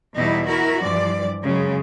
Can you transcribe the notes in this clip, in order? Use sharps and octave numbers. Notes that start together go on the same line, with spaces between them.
E2 B2 G3 D#4 E4
E4 F#4 A#4
G2 E3 F3 D5
F#2 C#3 F#3 G#3